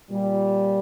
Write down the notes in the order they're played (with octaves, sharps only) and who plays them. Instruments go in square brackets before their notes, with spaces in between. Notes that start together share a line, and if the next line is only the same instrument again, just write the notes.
[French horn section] A#2 G3